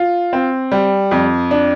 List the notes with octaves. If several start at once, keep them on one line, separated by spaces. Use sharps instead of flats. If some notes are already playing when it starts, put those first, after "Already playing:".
Already playing: F4
C4
G3
F2
D4